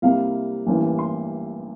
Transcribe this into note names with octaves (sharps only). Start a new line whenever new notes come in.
C2 C3 G3 A#3 F5
A1 G2 E3 A#3
C6